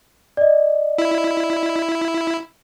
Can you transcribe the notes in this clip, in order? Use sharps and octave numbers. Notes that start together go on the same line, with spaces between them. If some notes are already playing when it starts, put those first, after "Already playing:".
D5 D#5
E4